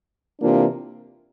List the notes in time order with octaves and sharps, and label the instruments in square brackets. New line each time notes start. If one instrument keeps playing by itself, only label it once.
[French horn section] C3 E3 A#3 D4 F4